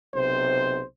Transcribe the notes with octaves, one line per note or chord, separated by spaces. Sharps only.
B1 C3 C5